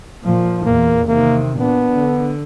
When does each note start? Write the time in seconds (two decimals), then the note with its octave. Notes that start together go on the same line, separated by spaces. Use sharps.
0.23 A#2 F3
0.66 E2 A#2 A#3
1.08 C3 D#3 A#3
1.60 A#2 B3 D4
1.96 D3